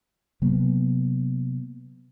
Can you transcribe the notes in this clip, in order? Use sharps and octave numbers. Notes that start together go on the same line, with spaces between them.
C3 F#3 A#3 B3